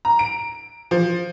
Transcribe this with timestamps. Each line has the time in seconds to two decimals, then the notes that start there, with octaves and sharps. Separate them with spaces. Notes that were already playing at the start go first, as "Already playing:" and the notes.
0.05 A#5
0.19 D7
0.91 F3